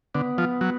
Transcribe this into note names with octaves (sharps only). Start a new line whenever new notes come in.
D3 B3
F3
F#3